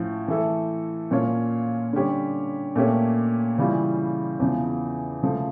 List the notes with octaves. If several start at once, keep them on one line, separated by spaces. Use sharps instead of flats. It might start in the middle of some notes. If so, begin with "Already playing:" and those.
Already playing: A2 F3 C#4
E3 A3 E4 A4
A#2 F3 C#4 F4 C#5
D3 G3 C#4 G4 C#5
A#2 A3 C#4 G4 C#5
C#3 E3 G3 C#4 F4
E2 C#3 F3
C#3 F3 A3